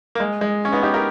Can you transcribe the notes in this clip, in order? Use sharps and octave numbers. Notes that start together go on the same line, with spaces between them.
A#3
G#3
G#3
C#4
B3 D#4
D#4 G4
G4 A#4